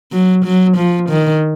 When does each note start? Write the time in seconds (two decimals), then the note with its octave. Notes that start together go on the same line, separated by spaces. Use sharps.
0.12 F#3
0.45 F#3
0.77 F3
1.09 D#3